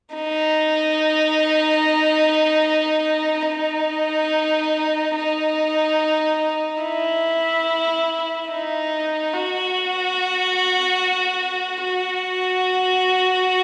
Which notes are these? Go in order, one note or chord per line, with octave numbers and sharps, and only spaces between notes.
D#4
D#4
D#4
E4
D#4
F#4
F#4